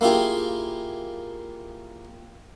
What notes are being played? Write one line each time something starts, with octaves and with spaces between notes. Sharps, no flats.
A#3 E4 F4 G4 G#4